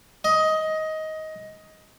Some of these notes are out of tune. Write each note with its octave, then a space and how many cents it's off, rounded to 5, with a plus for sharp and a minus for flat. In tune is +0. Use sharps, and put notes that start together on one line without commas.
D#5 +15